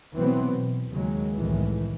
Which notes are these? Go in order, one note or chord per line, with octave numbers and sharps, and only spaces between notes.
B2 E3 F#3 B3 C4
B2
D#2 C#3 F#3 G#3
C2 F2 A2 D#3 E3 G#3